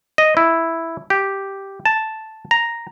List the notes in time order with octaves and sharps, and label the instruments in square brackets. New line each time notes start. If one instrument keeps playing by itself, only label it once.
[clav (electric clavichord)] D#5
E4
G4
A5
A#5